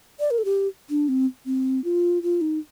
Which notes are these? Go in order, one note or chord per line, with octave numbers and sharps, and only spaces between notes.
D5
A#4
A4
G4
D4
C4
C4
F4
F4
D#4